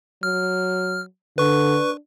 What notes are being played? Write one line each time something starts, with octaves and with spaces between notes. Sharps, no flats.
F#3 F6
D3 D4 B4 C#6